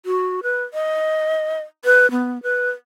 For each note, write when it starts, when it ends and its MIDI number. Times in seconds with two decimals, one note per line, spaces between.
0.06 0.40 66
0.43 0.63 71
0.74 1.61 75
1.85 2.10 71
2.11 2.41 59
2.43 2.70 71